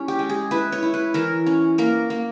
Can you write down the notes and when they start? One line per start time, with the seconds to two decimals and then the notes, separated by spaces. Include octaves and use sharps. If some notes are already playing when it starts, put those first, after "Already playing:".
Already playing: G3 C#4 E4
0.08 G4
0.19 G#3
0.30 G#4
0.51 E4 B4
0.72 C#5
0.83 E4
0.94 B4
1.14 E3 A#4
1.46 C#4
1.78 A#3 A#4
2.10 A#3